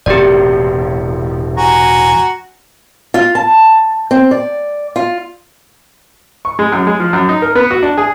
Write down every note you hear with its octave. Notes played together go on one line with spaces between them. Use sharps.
E1 A2 C3 G4 D5
F#4 G#5 A#5
F4
A5
C4
D5
F4
C#6
G#3
F#2
G#3
F3
F#2
D#4
A#4
B3
F#4
D4
G#4